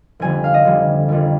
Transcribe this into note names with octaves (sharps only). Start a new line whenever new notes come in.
F1 F2 D3 G3 G#5
F5
D#5
F1 F2 D3 G3
F1 F2 D3 G3